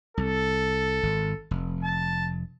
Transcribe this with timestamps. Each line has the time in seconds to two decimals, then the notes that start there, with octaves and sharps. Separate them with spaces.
0.17 C2 A4
1.03 G#1
1.51 F1
1.84 A5